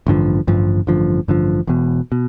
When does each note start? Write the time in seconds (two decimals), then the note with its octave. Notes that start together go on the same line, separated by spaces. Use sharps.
0.07 A1 G2 D3 F3
0.47 A1 G2 D3 F3
0.87 A1 G2 D3 F3
1.28 A1 G2 D3 F3
1.67 E1 E2 B2
2.12 B2